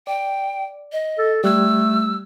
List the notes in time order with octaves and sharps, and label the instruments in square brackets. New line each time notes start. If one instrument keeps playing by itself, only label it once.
[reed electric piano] D5 [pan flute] G5
[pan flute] D#5
[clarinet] A4
[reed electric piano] G3 F#6 G#6 [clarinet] A3 [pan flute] E6